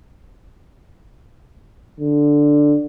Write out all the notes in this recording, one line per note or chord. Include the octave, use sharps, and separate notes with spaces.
D3